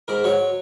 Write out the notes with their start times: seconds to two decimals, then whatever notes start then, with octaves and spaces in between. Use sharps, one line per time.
0.08 G#2 A#4
0.24 F#3 C#5